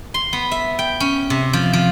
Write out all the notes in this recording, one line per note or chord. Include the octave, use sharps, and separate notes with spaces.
C6
B3
E5
G5
C#4
C3
F3
F3